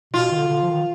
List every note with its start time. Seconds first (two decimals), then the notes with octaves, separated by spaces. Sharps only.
0.14 B2 F4
0.32 D#3
0.36 D3
0.48 D3
0.62 F3
0.70 D#3